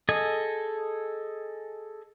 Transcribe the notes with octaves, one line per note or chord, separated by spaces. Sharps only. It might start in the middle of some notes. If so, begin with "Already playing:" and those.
G#4 A4 D#5 G#5